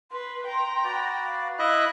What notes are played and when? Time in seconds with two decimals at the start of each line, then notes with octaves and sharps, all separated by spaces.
0.12 B4 C6
0.46 G5 A#5
0.84 F#4 B4 D5
1.25 F5
1.59 E4 D#5 E5 B5 F#6